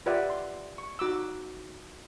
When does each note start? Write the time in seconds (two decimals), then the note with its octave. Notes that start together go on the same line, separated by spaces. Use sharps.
0.06 F4 G4 B4 D5 E5 F#5
0.30 C6
0.78 C#6
0.99 D#4 F#4 D6 E6